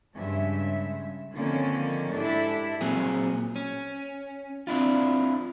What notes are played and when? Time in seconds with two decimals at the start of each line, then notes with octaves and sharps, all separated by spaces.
0.17 G2 C#3 G#3 E5
1.34 D3 D#3 F3 A#3 C4 C#4
2.12 G#2 D4 E4 G4 A4 E5
2.81 A#2 F#3 C4 G#4
3.56 C#4
4.67 C4 D4 E4 F4